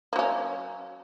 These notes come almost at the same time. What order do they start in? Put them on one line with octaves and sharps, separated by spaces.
A#3 F#3 C#4